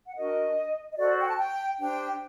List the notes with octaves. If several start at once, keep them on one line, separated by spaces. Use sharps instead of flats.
F#5
D4 F#4 A#4 D#5
D#5
F#4 A4 C5 D5
G5
A5
G5
D4 G4 C5 G5